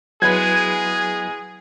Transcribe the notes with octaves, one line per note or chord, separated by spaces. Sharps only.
F#3 G#3 B3 E4 G#4 B4 G#6